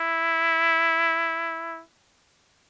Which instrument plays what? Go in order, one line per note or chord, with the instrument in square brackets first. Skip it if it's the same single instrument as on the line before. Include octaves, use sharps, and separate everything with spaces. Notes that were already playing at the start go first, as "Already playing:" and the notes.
Already playing: [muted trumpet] E4